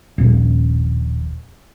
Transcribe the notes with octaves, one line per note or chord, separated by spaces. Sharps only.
D#1 A#1